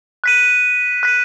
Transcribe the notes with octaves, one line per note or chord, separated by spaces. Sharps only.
F#6 B6 D#7
F#6 B6 D#7